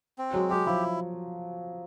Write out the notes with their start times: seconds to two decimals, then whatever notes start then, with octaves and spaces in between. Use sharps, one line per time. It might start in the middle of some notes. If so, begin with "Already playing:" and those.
0.18 C4
0.33 F#3 G#3
0.50 F#3 G4
0.66 F3 E4